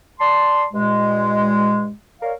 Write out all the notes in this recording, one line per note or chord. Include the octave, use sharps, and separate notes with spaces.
D5 A5 C6
G2 A#2 G#3
A#4 C#5 D5 F5